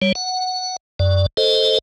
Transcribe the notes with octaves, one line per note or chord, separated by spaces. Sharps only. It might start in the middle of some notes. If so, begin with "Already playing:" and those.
G3 C#5
F#5
F#2 D5
A4 C5 D#5